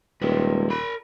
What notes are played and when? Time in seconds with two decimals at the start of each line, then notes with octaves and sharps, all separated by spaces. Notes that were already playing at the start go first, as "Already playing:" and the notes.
0.22 D#1 G#3 B4
0.70 A#4 B5